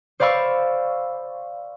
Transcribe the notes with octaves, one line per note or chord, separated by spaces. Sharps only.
C5 D5 F5 B5 C#6 E6